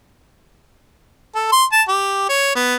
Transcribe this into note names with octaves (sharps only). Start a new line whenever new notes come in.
A4
C6
A5
G4
C#5
B3